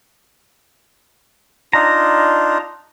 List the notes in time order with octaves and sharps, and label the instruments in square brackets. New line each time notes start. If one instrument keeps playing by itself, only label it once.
[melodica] D4 D#4 F4 [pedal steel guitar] A#5